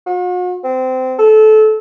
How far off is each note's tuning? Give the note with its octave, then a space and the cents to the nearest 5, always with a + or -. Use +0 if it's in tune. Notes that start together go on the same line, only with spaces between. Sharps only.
F#4 -45
C4 -20
A4 -25